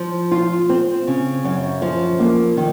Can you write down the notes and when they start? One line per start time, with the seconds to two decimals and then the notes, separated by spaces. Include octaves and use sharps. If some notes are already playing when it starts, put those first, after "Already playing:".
Already playing: F3
0.31 F4
0.69 C4
1.07 C#3
1.44 F#2
1.82 F3
2.20 A#3
2.57 D#3